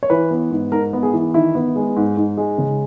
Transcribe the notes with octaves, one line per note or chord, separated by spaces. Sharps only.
C#5
E3 B4
B3
G#2
G#2 A#4
B3
G#4
E3
D#3 E4
B3
G#3
G#2
G#2
G#3
C#3